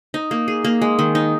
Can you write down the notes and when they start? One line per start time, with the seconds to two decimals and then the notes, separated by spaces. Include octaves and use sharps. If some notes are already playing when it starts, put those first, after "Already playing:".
0.14 D#4
0.31 A#3
0.48 G#4
0.65 A#3
0.82 G#3
0.99 D#3
1.15 D#4